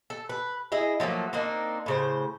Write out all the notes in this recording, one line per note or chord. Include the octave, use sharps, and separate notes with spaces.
A4
B4
E4 G#4 D#5
F3 F#3 A3 A#3
A#3 C4 D4 D#4
A2 C#3 C5